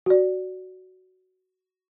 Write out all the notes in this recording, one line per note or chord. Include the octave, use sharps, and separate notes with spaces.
F#4 D5